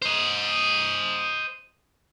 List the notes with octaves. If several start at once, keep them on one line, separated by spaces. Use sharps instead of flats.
C5 D#5